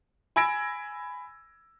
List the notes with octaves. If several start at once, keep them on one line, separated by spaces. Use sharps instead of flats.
G#5 B5 E6 G#6 A#6 D7